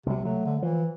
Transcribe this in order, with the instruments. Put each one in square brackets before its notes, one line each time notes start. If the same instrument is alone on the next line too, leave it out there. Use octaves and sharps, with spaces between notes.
[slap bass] C2 F#3 [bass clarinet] C3
[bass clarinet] F#3 [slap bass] A3
[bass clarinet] D3
[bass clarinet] E3 [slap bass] F3